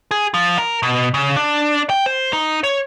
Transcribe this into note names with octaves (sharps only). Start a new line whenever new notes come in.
G#4
F3
A#4
B2
C#3
D4
G5
C5
D#4
C#5